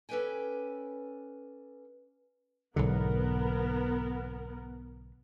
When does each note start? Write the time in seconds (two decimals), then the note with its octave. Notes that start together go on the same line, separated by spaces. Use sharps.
0.09 C#4 A4 B4 D5 G5 G#5
2.76 B1 G#2 D3 B3 A#4